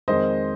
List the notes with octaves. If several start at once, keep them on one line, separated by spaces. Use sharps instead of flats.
F2 D#3 G#3 C5 D#5